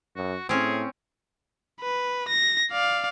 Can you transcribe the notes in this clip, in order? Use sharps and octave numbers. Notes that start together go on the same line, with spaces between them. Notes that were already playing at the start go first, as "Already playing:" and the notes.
F#2 F#4
A2 C4 C#4 G#4
B4
A#6
D5 F5